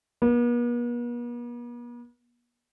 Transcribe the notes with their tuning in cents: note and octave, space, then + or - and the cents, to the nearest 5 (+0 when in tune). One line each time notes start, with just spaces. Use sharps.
B3 -45